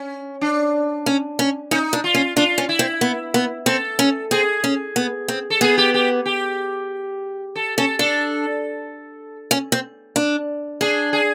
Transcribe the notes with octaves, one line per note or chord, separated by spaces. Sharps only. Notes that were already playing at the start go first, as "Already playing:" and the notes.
Already playing: C#4
D4
C#4
C#4
C#4 D#4
D4
F4
C#4
D4 F4
C#4
E4
C4
B3
B3
C4 A4
C#4
C4 G#4
C#4
B3
C4
A4
B3 G#4
G4
G4
G4
A4
C#4 A4
D4 A4
C#4
C4
D4
D4 G#4
G#4